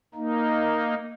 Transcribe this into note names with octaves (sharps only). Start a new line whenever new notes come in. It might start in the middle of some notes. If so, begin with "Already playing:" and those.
A#3 D#4